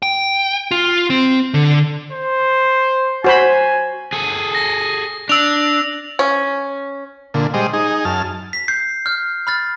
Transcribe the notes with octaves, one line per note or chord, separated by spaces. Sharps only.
G5
F4
C4
D3
C5
F#4 C5 G#5 B5
G#4 A4
A#6
D4 E6 F7
C#4
A#2 D3
G3 G#3 C5 D#5
D#4 G#4
F#2 A5 F6
B6
G6 C7
F6 G6
B5 F6 A6